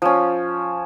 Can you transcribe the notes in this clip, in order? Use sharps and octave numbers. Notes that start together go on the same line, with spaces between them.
F3 C#4